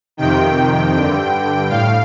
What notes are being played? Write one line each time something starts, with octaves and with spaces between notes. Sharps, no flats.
F2 C3 D#3 G5
G2 D3
A2 F5